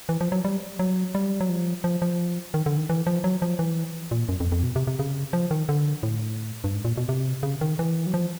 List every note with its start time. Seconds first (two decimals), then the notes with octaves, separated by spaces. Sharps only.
0.09 E3
0.21 F3
0.32 F#3
0.45 G3
0.79 F#3
1.15 G3
1.40 F#3
1.49 F3
1.84 F3
2.02 F3
2.54 D#3
2.66 D3
2.77 D#3
2.90 E3
3.07 F3
3.24 F#3
3.42 F3
3.59 E3
4.11 A#2
4.29 F#2
4.40 F2
4.52 F2
4.63 B2
4.76 C3
4.87 C3
4.99 C#3
5.33 F3
5.51 D#3
5.69 D3
6.03 A2
6.64 G2
6.74 G#2
6.85 A#2
6.97 B2
7.09 C3
7.43 C#3
7.61 D#3
7.79 E3
8.06 F#3
8.14 F3